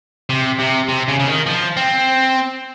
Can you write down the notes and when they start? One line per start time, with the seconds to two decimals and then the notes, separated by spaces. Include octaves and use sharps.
0.30 C3
0.59 C3
0.88 C3
1.08 C#3
1.20 C#3
1.27 D#3
1.47 F3
1.77 C4